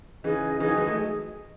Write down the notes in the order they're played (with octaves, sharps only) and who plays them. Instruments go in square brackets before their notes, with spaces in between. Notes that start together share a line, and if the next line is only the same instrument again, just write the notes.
[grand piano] C#3 E3 [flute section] D#4 G#4 D#5
[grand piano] C#3 E3 [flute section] D#4 G#4 D#5
[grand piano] D#3 F#3
E3 G#3
F#3 A3